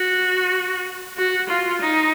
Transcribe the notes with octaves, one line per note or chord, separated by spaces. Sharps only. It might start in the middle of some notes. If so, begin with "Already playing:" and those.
Already playing: F#4
F#4
F4
D#4